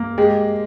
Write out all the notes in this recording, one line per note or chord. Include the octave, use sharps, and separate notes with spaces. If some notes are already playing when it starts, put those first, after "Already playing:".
Already playing: A#3
G#3 G4